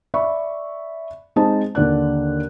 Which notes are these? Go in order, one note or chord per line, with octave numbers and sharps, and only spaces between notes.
D5 E5 B5 C#6
G#3 C4 D#4 C5 D#5 A5
D#2 D3 D5 F#6